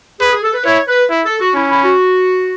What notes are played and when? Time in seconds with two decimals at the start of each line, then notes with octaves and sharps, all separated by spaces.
0.20 G#4 B4
0.32 G#4
0.43 A4
0.54 B4
0.65 E4 C#5
0.88 B4
1.10 E4
1.25 A4
1.40 F#4
1.54 C#4 E4
1.70 E4
1.85 F#4